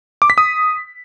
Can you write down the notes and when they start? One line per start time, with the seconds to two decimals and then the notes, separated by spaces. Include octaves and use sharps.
0.22 D6
0.30 B6
0.38 D#6